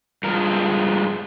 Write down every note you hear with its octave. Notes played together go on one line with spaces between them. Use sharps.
G2 F3 G#3 A#4
C4